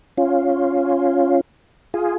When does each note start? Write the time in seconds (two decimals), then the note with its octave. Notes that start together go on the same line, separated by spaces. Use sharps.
0.17 C#4 F4
1.94 F4 G#4